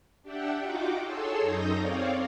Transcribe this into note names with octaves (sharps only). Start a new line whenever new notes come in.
D4 G4 E5 F#5 G5
D#4 F4 F#4 G5 D6
G#4 A4 C#5 C6 E6
F#2 D#4 D#6 G6 A#6
C4 C#5 D5 F5